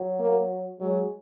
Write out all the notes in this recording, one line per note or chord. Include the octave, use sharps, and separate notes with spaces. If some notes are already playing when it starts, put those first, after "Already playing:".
Already playing: F#3
A#3
F#3 G#3